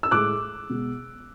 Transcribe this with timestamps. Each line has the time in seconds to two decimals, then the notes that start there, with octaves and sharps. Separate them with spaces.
0.03 E6
0.11 A2 G#3 D6 F#6
0.69 B2 G#3